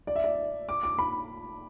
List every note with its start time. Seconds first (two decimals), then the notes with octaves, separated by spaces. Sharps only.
0.07 D5
0.16 E5
0.24 D5
0.69 D6
0.83 D6
0.99 B5